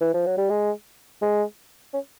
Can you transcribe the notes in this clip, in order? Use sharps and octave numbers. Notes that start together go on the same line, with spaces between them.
E3
F3
F#3
G3
G#3
G#3
C#4